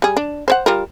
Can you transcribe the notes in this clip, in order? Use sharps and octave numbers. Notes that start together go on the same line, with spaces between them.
G3 G#4
D4
C5 C#5 F#5
G3 F4 A#4